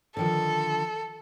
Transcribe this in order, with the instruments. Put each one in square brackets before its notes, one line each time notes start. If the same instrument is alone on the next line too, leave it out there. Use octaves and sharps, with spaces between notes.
[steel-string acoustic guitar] D3 D#3 F3 [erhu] A4